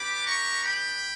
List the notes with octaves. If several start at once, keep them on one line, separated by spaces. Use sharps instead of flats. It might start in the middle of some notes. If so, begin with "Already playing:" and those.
Already playing: B3 D4 G4 B5 D6
A#5 C#6
G5 B5